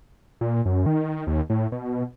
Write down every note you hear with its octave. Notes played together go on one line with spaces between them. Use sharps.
A#2
F#2
D#3
D#2
A2
B2